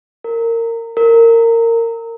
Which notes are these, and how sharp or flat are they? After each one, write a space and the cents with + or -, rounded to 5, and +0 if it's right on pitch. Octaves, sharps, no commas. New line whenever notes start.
A#4 -20
A#4 -20